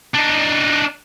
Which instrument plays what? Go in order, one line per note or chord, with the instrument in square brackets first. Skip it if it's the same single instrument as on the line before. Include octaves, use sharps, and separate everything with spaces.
[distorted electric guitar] D4 D#4